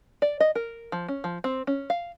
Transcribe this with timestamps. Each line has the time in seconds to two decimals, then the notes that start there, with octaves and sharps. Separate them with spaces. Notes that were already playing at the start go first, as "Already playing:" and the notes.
0.22 D5
0.40 D#5
0.55 A#4
0.92 F3
1.08 C#4
1.24 F3
1.44 C4
1.67 C#4
1.90 F5